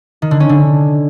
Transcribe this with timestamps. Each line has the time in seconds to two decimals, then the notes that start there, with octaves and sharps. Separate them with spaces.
0.22 D#3
0.31 D3
0.40 C#4
0.49 D3